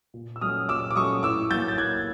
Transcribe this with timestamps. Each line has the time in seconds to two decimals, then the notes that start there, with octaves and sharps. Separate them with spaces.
0.14 A#2
0.36 E6
0.41 F#3 A3 C#4 D#6 F6
0.69 A#2 D6 E6
0.91 D6
0.96 F#3 A3 C#4 C#6 D#6
1.23 A2 D6 E6
1.50 F#3 A#3 G6 A6
1.68 A6
1.78 A2 F#6 G#6